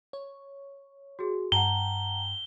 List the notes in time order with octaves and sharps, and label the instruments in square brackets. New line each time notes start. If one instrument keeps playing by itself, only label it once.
[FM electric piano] C#5
[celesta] F#4 G#4
[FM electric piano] G2 G5 [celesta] F#5 A5 A#5 [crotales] G7